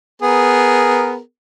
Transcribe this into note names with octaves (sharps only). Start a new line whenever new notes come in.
B3 G#4 A#4